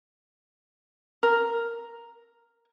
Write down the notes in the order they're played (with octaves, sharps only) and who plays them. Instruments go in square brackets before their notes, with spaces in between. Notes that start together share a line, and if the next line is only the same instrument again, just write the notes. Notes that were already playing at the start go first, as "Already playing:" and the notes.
[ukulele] A#4